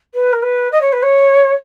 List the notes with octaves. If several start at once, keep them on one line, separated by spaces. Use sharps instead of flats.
B4
A#4
B4
D#5
C#5
B4
C#5